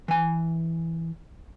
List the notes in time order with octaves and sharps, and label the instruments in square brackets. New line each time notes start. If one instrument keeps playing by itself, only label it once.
[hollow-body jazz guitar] E3 G#5